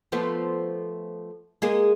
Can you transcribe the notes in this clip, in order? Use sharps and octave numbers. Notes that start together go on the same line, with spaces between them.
F3 A3 B3
G#3 A#3 G#4